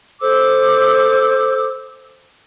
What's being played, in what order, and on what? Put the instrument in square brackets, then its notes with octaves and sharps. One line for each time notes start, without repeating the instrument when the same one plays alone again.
[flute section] A4 C5 D6 E6